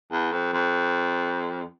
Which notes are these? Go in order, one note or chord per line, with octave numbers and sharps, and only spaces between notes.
E2
F2
F2